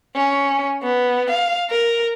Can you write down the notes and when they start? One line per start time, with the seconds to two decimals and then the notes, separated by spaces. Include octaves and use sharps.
0.15 C#4
0.83 B3
1.31 F5
1.70 A#4